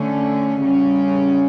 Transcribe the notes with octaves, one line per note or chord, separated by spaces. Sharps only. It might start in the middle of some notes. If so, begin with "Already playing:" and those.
Already playing: D3 A3 C#4
C#3 G3 C#4